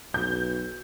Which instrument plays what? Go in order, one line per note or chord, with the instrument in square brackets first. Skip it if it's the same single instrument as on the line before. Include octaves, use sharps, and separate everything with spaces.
[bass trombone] B1 [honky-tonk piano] G6